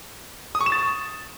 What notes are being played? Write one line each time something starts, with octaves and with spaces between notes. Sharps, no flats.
D#6
C#6
E7
A6